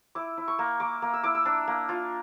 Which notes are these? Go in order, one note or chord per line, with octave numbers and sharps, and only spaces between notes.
E4 D6
E4
C#6
A#3
A#3 D6
A#3
E6
E4 D6
E6
D4
A#3
F4